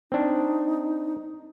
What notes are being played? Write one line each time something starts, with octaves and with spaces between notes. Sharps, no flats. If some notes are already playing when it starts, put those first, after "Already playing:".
C4 D4 D#4